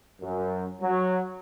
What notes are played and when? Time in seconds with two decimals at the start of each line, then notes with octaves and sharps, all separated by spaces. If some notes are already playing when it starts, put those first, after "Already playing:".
0.21 F#2
0.81 F#3